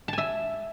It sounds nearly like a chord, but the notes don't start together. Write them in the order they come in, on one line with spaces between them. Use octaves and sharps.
A5 G#5 E5